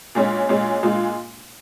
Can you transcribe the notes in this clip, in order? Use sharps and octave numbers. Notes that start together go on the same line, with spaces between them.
A#2 G#3 C#4
A#2 G#3 C#4
A#2 G#3 F4